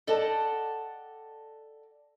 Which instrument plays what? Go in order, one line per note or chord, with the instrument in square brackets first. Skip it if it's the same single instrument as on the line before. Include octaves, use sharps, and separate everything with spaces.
[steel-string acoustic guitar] A4 D5 D#5 F#5 G5 A5